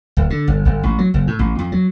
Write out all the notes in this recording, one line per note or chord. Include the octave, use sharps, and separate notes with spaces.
D1
D3
G1
G1
A1
F#3
F#1
A2
A1
F2
F#3